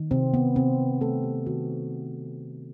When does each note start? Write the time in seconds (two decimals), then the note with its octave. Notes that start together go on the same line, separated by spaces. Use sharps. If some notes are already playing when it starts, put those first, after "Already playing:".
Already playing: D#3
0.11 C3 C4
0.34 B3
0.56 C3 C4
1.01 A3 A4
1.24 G4
1.46 D#3 F#4